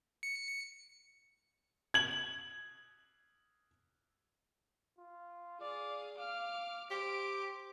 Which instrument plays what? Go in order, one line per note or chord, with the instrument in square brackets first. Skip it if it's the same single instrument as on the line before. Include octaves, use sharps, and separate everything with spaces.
[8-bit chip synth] C#7
[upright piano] G#6 F#7
[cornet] F4
[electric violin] G#4 F5 [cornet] D5
[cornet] F5 [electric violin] D6 F6
[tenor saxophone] G4 [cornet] C5 [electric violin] D7